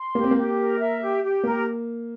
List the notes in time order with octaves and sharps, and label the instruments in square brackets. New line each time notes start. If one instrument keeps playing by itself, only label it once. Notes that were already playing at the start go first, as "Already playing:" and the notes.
Already playing: [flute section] C6
[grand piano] A#3 [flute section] G4
[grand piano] C4
A#3
[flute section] G4
A#4
E5
G4
G4
[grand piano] A#3 [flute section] A#4